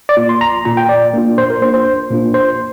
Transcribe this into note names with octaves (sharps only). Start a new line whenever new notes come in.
D5
A#2 A#3 F4
C6
A#1 A#5
A#2 A#3 F4 A#5
G5
A#2 D5
A#3 D4 F4
A#2 C5
A#4
A#3 D4 F4 C5
C5
A#1
A#2 A#3 D4 F4
A#1 C5